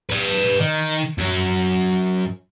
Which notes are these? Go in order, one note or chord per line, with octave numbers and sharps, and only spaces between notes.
B4 D5
D#3
F#2 F#3